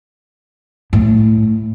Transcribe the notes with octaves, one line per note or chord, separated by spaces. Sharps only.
A2